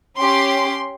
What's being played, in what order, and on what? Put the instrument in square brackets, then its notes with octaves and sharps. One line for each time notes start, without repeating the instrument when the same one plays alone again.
[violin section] C#4 G4 C6